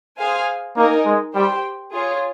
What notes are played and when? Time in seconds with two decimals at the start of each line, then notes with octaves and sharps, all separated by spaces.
0.18 G#4 C5 F5 G#5
0.76 A#3 D#4 A#4 D#5 G#5
1.05 G#3
1.34 G3 G4 C5 G5
1.92 F4 G#4 C#5